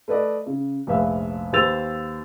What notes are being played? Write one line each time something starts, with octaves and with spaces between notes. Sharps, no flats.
A3 B4 D5 D#5
C#3
F1 A#1 B4 E5 F5
D#2 B4 C5 E6 A6 F7